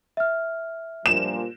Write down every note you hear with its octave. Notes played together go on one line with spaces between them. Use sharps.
E5 F6
G2 A#2 F3 E7